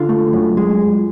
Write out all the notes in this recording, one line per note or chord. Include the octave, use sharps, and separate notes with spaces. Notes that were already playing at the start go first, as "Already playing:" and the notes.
Already playing: D3 F4 F5
A3
F#2
G#3